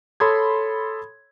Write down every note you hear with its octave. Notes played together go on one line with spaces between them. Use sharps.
A4 C#5 B5 C6 D#6 G#6